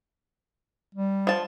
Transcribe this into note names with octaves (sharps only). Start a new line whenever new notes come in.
G3
F3 A5